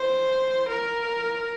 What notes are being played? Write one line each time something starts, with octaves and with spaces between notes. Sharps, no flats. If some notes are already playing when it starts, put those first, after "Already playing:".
Already playing: C5
A#4